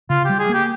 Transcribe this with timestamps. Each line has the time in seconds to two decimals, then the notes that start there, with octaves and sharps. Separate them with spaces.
0.10 C#3 F4
0.25 G3 G4
0.39 G#4
0.49 A#3 G4